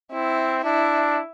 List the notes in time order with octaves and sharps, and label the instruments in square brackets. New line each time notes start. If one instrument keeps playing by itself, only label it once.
[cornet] C4 [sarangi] E4
[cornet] D4 [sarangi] E4